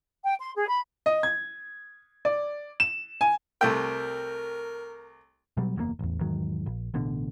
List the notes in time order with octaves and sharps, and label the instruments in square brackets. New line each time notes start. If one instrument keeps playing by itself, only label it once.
[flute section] G5
C6
G#4
B5
[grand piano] D#5
G#6
D5
E7
G#5
[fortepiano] C2 A3 G5 [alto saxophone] A#4
[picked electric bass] B2 F#3 G3
F#1 E2 A#2 A#3
A1 E2
E2 G#2 D#3 F#3
A#1
A1 B2 D3